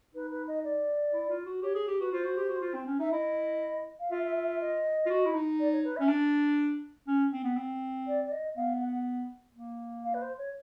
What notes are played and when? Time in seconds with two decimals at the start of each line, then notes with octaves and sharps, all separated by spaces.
0.14 D#4 B4
0.31 B4
0.47 D#5
0.64 D5
1.13 E4
1.29 F4
1.46 F#4
1.62 G4 C#5
1.75 G#4
1.87 G4
2.00 F#4 B4
2.13 F4 C5
2.24 F#4
2.37 G4
2.49 F#4
2.62 F4
2.74 C4
2.87 C#4
2.99 D#4 E5
3.12 E4 D#5
4.00 F5
4.10 F4 E5
4.23 E5
4.36 E5
4.47 E5
4.61 D#5
5.06 F4
5.10 F#4
5.26 E4
5.35 D#4
5.59 D5
5.72 C#5
5.84 B4
5.96 E5
6.00 C#4
6.09 D4
7.08 C#4
7.33 C4
7.44 B3
7.57 C4
8.07 D5
8.24 D5
8.31 D#5
8.56 B3 F5
8.81 F#5
9.54 A#3
10.04 F5
10.14 B4
10.21 C5
10.38 C#5